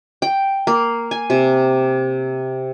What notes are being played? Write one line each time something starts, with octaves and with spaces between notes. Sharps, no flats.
G5
A#3
G#5
C3